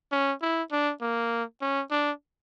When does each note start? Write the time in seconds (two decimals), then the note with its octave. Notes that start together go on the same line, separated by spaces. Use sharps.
0.12 C#4
0.42 E4
0.72 D4
1.02 A#3
1.62 C#4
1.91 D4